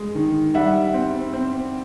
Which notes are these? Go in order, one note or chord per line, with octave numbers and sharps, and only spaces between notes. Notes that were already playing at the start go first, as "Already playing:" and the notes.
Already playing: G#3
D#3
G3 E5 F#5
C4
C4